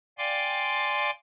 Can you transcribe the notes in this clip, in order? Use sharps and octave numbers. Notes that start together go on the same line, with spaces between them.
D5 F5 G5 G#5 C6 D6